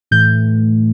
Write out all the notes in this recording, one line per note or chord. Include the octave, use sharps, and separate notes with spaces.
A2 E3 A3 G6